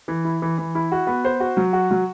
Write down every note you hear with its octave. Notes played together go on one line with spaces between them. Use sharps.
E3
E4
E3
E3
E4
F#4
B3
C5
F#4
F#3
F#4
F#3